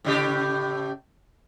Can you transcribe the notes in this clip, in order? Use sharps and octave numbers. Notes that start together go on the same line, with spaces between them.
A2 C#3 G4